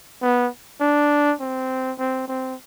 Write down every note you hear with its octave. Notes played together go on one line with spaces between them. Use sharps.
B3
D4
C4
C4
C4